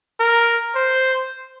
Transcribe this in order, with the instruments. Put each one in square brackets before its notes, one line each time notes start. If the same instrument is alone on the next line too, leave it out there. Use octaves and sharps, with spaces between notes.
[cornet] A#4
C5